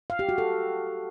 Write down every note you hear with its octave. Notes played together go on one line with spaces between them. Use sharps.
F5
G4
F#4
A4